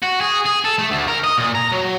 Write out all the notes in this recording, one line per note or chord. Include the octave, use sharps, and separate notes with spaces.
F#4
G#4
G#4
A4
A3
D2
A#4
D#5
A#2
A#5
F#3